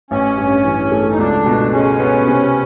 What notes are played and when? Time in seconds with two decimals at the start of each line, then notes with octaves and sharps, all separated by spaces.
0.11 A1 C#4
0.38 G2
0.65 E3
0.92 A3
1.11 D#4
1.18 C#2 D4
1.46 B2
1.73 G#3 C#4
2.00 B3
2.27 C3